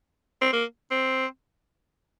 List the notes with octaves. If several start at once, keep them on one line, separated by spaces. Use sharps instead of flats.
C4
A#3
C4